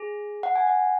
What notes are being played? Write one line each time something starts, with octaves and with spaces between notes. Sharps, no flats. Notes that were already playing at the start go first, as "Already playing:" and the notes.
Already playing: G#4
F#5
G#5
F#5